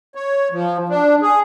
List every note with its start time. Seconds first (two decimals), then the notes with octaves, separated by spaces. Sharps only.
0.15 C#5
0.52 F3
0.89 D4
1.22 G#4